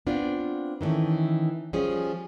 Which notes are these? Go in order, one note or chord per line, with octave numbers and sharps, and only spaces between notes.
B3 C4 D4 F4
D#3 E3 G3 A3 C#4
F3 G3 C#4 G#4